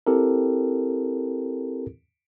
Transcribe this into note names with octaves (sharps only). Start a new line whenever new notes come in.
C4 E4 G4 A4 A#4